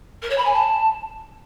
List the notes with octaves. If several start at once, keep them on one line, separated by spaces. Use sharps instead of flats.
A#4
C#5
B5
G#5
A5